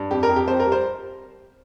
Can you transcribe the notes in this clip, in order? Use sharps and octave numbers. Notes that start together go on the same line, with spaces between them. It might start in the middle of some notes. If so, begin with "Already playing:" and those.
Already playing: G2
F2 G4
A#4
F2
G4
F2 C5
A#4
G3
C5